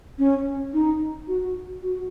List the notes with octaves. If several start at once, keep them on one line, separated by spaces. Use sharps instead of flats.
C#4
D#4
F#4
F#4